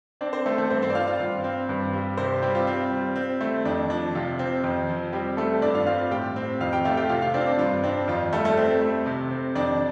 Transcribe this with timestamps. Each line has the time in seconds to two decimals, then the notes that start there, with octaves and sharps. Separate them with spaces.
0.21 C4 D4 D5
0.33 C4 C5
0.45 A3 A4
0.58 A3 A4
0.70 G2 C4 C5
0.82 C4 C5
0.90 D5
0.95 C4 F4 F5
1.07 F4 F5
1.20 G2
1.44 C4
1.69 G2
1.93 G3
2.17 C3 C4 C5
2.42 G3 C4 G4
2.55 F4
2.67 C4
2.91 G3
3.16 C4
3.41 A3
3.65 F2 D4
3.90 F3 D4
4.15 C3 F4
4.39 C4
4.64 F2
4.89 F3
5.13 G3 C4 G4
5.37 G3 A3 A4
5.62 G2 D4 D5
5.74 F4 F5
5.86 C4 F4 F5
6.11 A2 G4 G5
6.36 C4
6.60 F2 F4 F5
6.73 G4 G5
6.85 A3 F4 F5
6.97 G4 G5
7.09 C3 F4 F5
7.22 F4 F5
7.34 C4 D4 D5
7.47 D4
7.59 G2 F4
7.83 C4 D4
8.08 F2 F4
8.33 G3 A3 A4
8.45 A3 A4
8.57 C4
8.82 A3
9.06 C3
9.31 C4
9.55 F2 D4 D5